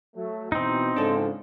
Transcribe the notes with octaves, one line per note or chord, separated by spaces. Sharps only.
F#3 A3
B2 E3 C4 D#4
G#2 C#3 F3 D4 A4